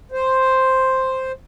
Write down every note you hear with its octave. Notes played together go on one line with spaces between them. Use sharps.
C5